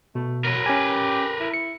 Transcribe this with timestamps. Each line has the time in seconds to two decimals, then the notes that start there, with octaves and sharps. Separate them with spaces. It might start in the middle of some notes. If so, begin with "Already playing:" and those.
0.15 B2 A3
0.45 F#3 A#4 B4
0.66 C#4 G4 G#5
1.40 E4
1.54 C#7